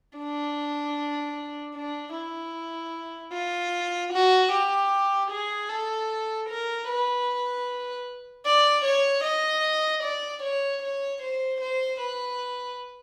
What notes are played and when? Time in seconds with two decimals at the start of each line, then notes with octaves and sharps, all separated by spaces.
0.18 D4
1.75 D4
2.14 E4
3.33 F4
4.12 F#4
4.52 G4
5.30 G#4
5.69 A4
6.49 A#4
6.88 B4
8.45 D5
8.85 C#5
9.24 D#5
10.03 D5
10.42 C#5
10.82 C#5
11.22 C5
11.60 C5
12.00 B4